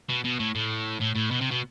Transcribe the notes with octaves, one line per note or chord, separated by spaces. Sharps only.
B2
B2
A2
A2
A2
A2
B2
C3
B2